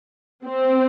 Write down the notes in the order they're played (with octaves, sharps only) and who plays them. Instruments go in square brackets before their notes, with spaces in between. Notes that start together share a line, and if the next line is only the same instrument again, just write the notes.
[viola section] C4